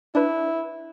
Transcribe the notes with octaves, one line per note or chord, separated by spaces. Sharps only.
D4 E4 B4